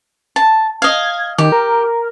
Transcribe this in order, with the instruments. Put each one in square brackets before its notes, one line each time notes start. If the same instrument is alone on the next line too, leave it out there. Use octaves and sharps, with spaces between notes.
[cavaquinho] A5
[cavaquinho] D#5 F5 [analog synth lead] G#6
[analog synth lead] D#3 [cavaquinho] G4
[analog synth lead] A#4